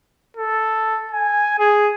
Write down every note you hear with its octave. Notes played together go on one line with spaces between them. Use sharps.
A4
G#5
G#4